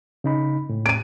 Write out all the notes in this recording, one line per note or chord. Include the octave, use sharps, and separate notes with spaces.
C#3 D#4 B5
A2
D7 D#7